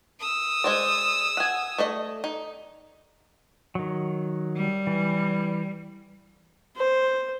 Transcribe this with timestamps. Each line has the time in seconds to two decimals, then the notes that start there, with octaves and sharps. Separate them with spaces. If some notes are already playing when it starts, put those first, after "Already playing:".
0.20 D#6 E6
0.64 G#3 C5 D5
1.37 F#5 G#5
1.78 A3 D5 D#5
2.24 D#4
3.75 D#3 F#3
4.56 G3
4.87 E3
6.77 C5